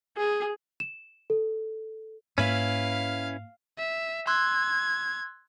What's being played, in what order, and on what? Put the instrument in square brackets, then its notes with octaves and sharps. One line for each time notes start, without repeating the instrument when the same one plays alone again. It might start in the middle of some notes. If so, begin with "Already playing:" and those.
[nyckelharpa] G#4
[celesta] E7
A4
[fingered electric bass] G#2 A#3 [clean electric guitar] C#4 E4 B4 [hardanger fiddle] F5
[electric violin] E5
[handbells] C6 E6 F#6 [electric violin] G#6